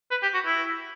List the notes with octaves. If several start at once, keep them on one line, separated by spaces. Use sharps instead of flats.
B4
G4
F#4
E4